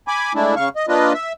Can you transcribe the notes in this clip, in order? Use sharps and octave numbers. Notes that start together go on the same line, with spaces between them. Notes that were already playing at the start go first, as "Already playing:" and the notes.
G#5 B5 D6
G#3 A3 D4 E4
C#3 F5 C#6
D#5
A#3 D4 F4 B4 D#5
E5